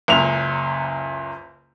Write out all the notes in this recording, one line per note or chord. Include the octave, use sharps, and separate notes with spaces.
F#1 C#2 F7